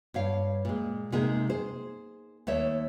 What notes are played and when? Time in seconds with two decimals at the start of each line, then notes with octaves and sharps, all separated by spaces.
0.14 G2 C#5 F5
0.65 A#2 G#3
1.12 C3 G#3 A#3 D#4 G#4
1.50 G#4 C5
2.47 D#2 A3 C#5 E5